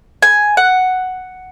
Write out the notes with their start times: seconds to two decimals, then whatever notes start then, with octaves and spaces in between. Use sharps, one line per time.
0.22 G#5
0.57 F#5